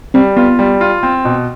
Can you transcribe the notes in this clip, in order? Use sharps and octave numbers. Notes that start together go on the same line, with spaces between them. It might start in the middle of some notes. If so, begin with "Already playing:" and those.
G3 C4
B3 F4
G3
F4
C4
B2